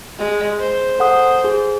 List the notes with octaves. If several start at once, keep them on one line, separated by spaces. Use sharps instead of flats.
G#3
C5
A4 F#5 D#6
G#4